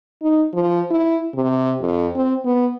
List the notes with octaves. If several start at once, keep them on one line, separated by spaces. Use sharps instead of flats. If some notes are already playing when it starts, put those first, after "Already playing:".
D#4
F3
E4
C3
F2
C4
B3